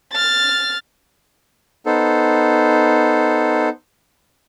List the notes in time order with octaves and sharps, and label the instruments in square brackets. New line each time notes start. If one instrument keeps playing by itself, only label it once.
[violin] F6 A6
[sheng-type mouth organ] B3 D#4 A4 C5